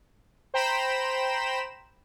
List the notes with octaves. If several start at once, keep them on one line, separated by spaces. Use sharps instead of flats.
C5 G5 A#5 B5 E7